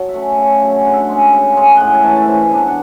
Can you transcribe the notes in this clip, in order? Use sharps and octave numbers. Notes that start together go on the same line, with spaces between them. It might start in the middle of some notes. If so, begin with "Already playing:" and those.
Already playing: F#3 A5
E5
A3 C#4 F#5
C#3
F#3 C#4
D3 F#5
E5
F#5
G#3 C#4
C#3
G#3 C#4
A2 F#5 G#5
G#5
E3 A3 A5
A5
G#2 G#5
E3 B3 D4 A5
F#5